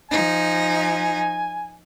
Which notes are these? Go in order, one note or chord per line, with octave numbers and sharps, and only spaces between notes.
F3 D#4 G#5